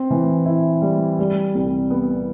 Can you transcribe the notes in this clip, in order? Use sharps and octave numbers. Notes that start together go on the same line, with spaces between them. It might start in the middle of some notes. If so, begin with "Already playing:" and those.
Already playing: C4
E3
E4
G3
G3
C2
B3